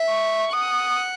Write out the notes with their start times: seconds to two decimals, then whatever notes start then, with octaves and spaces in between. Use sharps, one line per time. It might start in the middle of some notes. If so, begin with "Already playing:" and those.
Already playing: E5
0.10 C#6
0.53 F#5 D#6